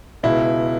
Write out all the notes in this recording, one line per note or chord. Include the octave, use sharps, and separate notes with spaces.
C#2 B2 E4